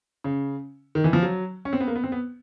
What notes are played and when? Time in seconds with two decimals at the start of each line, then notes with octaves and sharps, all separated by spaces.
0.24 C#3
0.95 D#3
1.04 E3
1.13 F3
1.23 F#3
1.65 C#4
1.73 C4
1.80 B3
1.87 A#3
1.96 B3
2.04 C4
2.12 B3